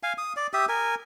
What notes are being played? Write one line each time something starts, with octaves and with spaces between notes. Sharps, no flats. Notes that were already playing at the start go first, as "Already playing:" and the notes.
F5 G#5
D#6
D5
G4 E5 D#6
A#4 G#5